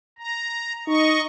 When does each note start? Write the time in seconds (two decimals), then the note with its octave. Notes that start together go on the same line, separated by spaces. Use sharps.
0.19 A#5
0.88 D#4 D#5 C#6